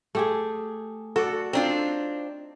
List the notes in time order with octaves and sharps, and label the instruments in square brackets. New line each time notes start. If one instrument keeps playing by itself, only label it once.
[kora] A3 G4 G#4
[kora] F#4 D5 F#5 [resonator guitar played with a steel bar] A4
[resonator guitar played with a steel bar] C4 D4 F4 [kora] D#4